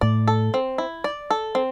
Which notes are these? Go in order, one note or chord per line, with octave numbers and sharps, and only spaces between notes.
A2 D5
A4
C4
E4
D5
A4
C4